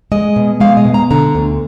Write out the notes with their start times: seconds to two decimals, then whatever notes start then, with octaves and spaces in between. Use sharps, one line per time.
0.12 G#3 D#5
0.36 B2
0.60 G#3 F5
0.77 D#5
0.85 B2
0.94 A#5
1.11 D3 A#5
1.35 D2